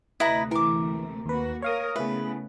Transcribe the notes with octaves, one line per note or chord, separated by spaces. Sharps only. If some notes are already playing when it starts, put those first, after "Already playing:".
D2 C3 A3 E4 B4 D#5 A#5 B5
E3 A#4 D6
D#2 A#3 F#4 B4
A#4 C#5 F5 D#6
C#3 A3 B3 E4 G#4 B4